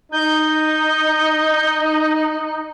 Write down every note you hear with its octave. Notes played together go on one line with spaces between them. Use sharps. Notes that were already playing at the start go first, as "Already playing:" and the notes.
D#4 G6